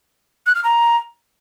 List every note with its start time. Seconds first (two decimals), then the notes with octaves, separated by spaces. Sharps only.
0.46 F#6
0.55 F6
0.64 A#5